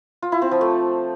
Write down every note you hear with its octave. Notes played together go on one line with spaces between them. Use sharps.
F4
E4
C4
F3
A3